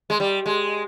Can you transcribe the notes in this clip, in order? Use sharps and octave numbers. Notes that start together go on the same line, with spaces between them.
G#3
G3
G#3